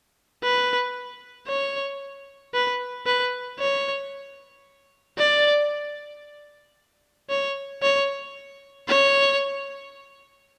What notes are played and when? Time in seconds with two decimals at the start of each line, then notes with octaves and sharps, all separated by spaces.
0.43 B4
1.48 C#5
2.54 B4
3.06 B4
3.59 C#5
5.18 D5
7.29 C#5
7.82 C#5
8.88 C#5